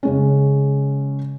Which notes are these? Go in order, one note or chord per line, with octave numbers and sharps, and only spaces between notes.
C#3 G#3 C#4